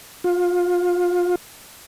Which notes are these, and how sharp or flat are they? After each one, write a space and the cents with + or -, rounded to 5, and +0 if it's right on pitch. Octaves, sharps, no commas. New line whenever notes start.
F4 +25